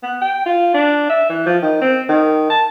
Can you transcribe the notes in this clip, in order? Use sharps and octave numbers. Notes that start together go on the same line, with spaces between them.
B3
G5
F4
D4
E5
E3
F3
D#3
C4
D#3
A5